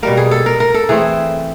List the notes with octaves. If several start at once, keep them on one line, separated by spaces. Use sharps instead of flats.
B2 G3 A#3 A#4
G#4
A4
A#4
A#4
A4
E3 A3 C4 G#4